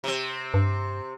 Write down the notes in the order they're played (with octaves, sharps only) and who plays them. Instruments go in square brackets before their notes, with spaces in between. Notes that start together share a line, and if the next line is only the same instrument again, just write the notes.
[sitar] C3 C4
[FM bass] G2